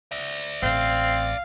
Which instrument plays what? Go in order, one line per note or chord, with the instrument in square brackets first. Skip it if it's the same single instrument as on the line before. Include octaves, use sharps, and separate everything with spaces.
[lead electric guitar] D5 E5
[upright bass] A1 [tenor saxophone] C4 [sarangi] F5